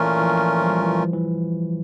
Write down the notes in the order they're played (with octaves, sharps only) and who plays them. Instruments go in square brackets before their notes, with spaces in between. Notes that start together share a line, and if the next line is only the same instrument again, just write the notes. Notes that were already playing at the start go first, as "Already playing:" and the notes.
Already playing: [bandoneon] A#2 A3 C#4 F4 A#4 [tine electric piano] E3
[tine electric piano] E3
F3
F3
G3
E3
F3
E3